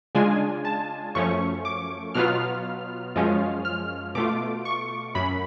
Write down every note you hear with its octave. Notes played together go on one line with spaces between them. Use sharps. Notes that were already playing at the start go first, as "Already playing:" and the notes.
C#3 G#3 D4 F4 G#5
A5
F#2 F3 A3 C#4 C#6
D6
B2 F#3 B3 F4 F6
F#2 F3 G#3 C#4 F4
F6
B2 A3 F4 D6
C#6
F#2 B5